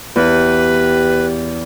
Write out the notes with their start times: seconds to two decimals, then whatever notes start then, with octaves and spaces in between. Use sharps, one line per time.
0.16 E2 G4 B4